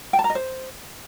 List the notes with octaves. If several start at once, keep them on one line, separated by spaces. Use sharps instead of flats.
G5
A5
A#5
D#5
C5